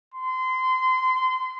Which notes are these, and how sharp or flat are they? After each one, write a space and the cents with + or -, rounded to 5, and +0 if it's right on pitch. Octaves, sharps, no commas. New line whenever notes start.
C6 -25